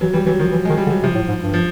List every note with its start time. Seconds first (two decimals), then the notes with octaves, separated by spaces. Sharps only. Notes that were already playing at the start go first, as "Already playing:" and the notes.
0.01 E3 F#3
0.13 E3 G3
0.26 E3 F#3
0.39 D#3 F3
0.52 E3
0.65 D#3 G#3
0.77 G3
0.86 D3
0.90 F#3
1.03 C3 F3
1.15 A2
1.28 G#2
1.41 G2
1.54 F3